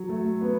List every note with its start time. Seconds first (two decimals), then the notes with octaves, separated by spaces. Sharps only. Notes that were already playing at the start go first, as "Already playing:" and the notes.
Already playing: F#3
0.09 A3
0.41 B3